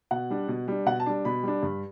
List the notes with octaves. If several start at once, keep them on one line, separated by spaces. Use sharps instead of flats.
B2 F#5
G3 D4
B2
G3 D4
B2 F#5
A5
G3 D4
B2 B5
G3 D4
G2